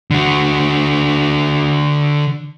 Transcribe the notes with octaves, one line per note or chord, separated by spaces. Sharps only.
D3 F#4